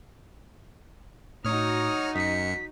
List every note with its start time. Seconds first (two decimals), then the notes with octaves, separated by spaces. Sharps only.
1.45 A2 D#4 F#4 C#5 D#6 F6
2.15 F#2 D#5 B6 C#7